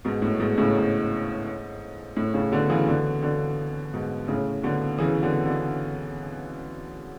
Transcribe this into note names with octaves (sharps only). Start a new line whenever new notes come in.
G#2 B2
A2
G#2 B2
A2 C#3
G#2
A2
A2 C#3
B2 D3
C#3 E3
B2 D3
B2 D3
G#2 B2
A2 C#3
B2 D3
C#3 E3
B2 D3
B2 D3